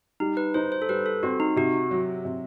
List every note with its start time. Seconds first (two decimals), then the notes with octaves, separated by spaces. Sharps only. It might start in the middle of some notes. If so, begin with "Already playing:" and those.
0.20 G3 D#4
0.37 B4
0.54 D#4 C5
0.72 C5
0.82 A4
0.89 G3 B4
1.06 A4
1.23 C4 F#4
1.40 D#4
1.56 C3 F#4
1.91 F#3
2.25 C3